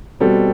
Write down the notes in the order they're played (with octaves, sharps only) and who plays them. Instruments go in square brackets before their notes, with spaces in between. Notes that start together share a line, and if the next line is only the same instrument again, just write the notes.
[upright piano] B2 G3 C4 F#4 A4